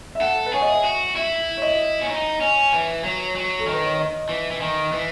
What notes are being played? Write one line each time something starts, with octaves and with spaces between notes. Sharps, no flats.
E5
A4 F#5
B4
G#4 C#5
D#5
E5
F#4
E4 E5
C#5
D#5
C#4
D#4
C#4
E3
F#3
F#3
A4
D#3
B4
C#5
D#5
E3
E3
D#3
E3